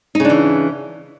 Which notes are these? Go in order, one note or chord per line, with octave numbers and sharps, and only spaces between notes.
C#3 E3 D4 D#4